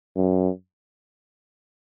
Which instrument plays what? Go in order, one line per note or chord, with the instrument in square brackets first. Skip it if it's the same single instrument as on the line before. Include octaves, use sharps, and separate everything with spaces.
[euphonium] F#2